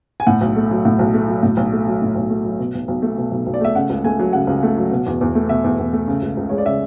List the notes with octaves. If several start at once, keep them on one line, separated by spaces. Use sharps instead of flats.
G#5
A2 F#5
B1
A3
F#3
A2
B1
A3
F#3
A2
B1
A3
F#3
A2
B1
A3
F#3
B2
B1
B1
A3
B2
B1
B1
D5
A3 E5
C#3 F#5
C#2
A3 G#5
F#3
C#3 F#5
C#2
A3
F#3
B2
E2
E2
A3
B2 E5
E2
E2
A3
C#3
C#2
C#2
G#3 C#5
D5
C#3 E5